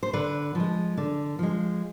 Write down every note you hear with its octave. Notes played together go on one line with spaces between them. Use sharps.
C5
D3 B4
F3 G#3
D3
F3 G#3